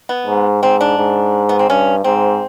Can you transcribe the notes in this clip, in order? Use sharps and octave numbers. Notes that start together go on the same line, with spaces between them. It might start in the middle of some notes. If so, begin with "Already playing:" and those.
B3
G#2
G#2 C4
D4
G#2
B3
C4
G2 C#4
G#2 C4